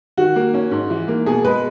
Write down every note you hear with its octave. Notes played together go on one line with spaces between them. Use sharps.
D#3 F#4
A#3
C#4
G#2
E3
A#3
B2 G#4
G#3 B4